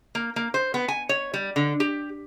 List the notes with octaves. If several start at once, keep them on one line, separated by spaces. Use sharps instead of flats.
A#3
A#3
C5
B3
G#5
C#5
G3
D3
G4